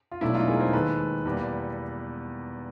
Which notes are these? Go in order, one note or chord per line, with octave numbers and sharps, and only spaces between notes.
F4
E1 E2 B2 F#3 A3 D4 E4
D#4 F4
G#4 A#4
A#4 C5
D#2 D#3 G#3 A4 B4
E2 B2 G3 A#3